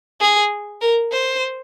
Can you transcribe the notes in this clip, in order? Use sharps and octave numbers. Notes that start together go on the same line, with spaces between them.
G#4
A#4
C5